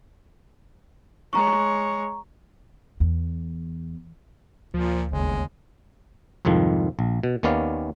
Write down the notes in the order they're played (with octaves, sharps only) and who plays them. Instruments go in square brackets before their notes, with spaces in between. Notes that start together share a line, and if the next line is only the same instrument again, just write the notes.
[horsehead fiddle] G#3 C#5 [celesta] A#5 C#6
[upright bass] E2
[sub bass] D2 [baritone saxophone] A#2 [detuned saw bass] F3
[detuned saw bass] G1 [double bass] D#2 C#3 [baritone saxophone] G#3
[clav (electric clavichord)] C2 F2 G#2 D#3 F3
A#1
B2
D#2 D#3 B3 C#4 D5 F5